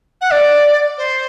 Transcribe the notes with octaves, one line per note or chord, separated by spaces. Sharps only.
F#5
D5
C5